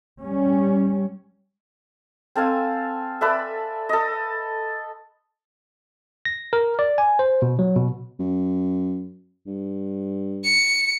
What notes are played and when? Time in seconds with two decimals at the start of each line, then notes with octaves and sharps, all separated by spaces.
0.22 G3 C#4
2.35 C4 A4 F5 G#5
3.21 A4 B4 D5 E5
3.89 A4 D#5
6.25 A#6
6.53 A#4
6.79 D5
6.98 G#5
7.19 C5
7.42 B2
7.59 F#3
7.76 B2
8.19 F#2
9.46 G2
10.44 C#7